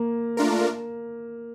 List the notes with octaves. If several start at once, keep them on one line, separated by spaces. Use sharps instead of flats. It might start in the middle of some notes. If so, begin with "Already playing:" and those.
Already playing: A#3
A3 D4 F4 A#4